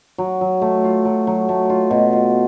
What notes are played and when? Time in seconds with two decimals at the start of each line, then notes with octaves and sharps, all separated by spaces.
0.18 F#3
0.41 F#3
0.62 A3
0.84 F4
1.05 F#3
1.27 F#3
1.49 A3
1.70 F4
1.91 B2
2.13 F4